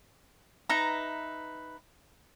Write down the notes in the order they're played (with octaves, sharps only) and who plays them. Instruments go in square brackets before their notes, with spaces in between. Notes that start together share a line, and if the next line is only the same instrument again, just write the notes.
[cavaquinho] D#4 B4 E5 A#5